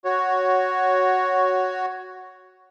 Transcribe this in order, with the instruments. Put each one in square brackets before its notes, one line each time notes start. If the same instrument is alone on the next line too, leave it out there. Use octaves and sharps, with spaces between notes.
[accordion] F#4 C#5